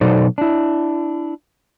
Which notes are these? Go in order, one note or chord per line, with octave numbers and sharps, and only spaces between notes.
B2 F#3 D#4 A4 C5 D5
D4 E4